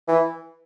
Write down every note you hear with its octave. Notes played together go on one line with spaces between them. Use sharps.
E3